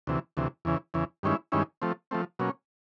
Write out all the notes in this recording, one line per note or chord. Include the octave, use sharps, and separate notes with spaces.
D2 C3 E3
D2 C3 E3
E2 C#3 E3
E2 C#3 E3
G2 D#3 G#3 C#4 E4
G2 D#3 G#3 C#4 E4
F3 A3 C4
F3 A3 C4
B2 F#3 A#3 C#4